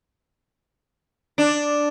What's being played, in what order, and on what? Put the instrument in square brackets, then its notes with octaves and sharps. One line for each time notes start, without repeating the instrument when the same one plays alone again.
[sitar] D4